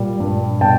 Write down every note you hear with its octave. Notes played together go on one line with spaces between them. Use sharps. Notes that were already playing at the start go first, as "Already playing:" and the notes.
Already playing: A#2 G3
G2
B2 G5 A5